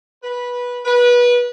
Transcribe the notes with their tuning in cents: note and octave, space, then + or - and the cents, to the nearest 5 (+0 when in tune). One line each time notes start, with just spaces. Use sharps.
B4 -15
B4 -25